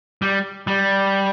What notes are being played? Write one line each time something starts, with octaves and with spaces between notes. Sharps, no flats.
G3
G3